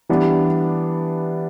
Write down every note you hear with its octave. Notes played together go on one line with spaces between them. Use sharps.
E3 G3 B3 D4